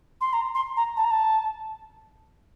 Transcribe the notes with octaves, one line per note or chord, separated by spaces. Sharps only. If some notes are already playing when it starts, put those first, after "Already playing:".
C6
A#5
C6
A#5
A5
A#5
A5